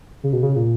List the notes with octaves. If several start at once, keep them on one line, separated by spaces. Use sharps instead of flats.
C#3
B2
C#3
A#2